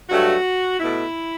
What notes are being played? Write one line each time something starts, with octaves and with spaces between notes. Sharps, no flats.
G2 F#3 A3 F#4
B2 A3 E4